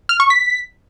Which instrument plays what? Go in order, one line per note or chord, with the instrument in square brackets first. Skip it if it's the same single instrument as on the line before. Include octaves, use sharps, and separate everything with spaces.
[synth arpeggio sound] F6
C#6
B6